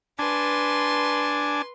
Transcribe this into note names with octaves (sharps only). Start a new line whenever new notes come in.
D4 B4 G#5 A5 C6